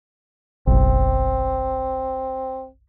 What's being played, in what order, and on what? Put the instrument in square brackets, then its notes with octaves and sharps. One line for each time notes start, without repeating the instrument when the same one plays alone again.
[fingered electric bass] F#1 B1 [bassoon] C4